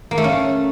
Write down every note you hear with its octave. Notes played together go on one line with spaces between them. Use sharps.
A#3
A3
C#4